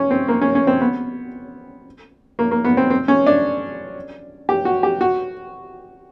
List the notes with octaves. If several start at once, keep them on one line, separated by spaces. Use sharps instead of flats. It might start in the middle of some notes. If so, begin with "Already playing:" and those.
Already playing: C#4
C4
A#3
C#4
C#4
C4
B3
A#3
A#3
B3
C4
C4
C#4
D4
G4
F#4
G4
F#4